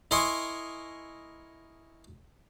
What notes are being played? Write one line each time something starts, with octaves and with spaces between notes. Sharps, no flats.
E4 A#4 D#5 G#5 C6 C#6